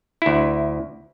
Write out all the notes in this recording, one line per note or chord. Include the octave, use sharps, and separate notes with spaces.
D2 E4